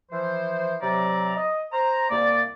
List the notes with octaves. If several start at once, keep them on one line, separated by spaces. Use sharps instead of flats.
E3 F3 C5
C3 F#3 D5 A#5
D#5
C5 A#5
C2 A#3 D5